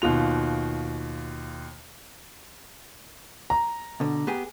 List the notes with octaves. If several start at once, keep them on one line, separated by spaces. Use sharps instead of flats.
D#2 B2 F4 F7
A#5
B2 D3
B3 G4 G#4